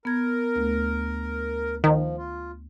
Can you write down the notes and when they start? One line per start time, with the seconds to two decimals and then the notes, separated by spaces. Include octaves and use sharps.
0.05 B3 A#4 G#6
0.56 D2 A3
1.84 D#3 F3
2.18 F4